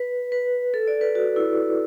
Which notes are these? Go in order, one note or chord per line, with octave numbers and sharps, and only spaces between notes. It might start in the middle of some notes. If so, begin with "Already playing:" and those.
Already playing: B4
B4
A4
D5
B4
F#4
E4